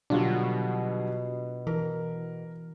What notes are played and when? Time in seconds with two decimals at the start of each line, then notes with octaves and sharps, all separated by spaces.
0.10 B2 D3 F#3 G3 D4 F4 F#4
1.67 E3 A#4